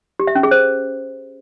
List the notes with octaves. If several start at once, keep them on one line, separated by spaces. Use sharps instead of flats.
G4
E5
C#4
G#4
C5